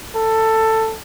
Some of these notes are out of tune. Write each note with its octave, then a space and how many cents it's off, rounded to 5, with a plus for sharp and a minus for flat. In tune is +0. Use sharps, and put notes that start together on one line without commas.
A4 +15